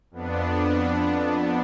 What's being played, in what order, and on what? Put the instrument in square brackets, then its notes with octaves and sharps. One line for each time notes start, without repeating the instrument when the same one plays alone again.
[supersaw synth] F2 B3 D4